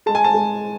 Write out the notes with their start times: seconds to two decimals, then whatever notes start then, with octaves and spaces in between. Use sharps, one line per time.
0.06 G#3 A5
0.15 G#5
0.24 A5
0.34 G#3